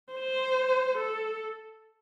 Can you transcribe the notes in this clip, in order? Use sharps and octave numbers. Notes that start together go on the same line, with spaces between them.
C5
A4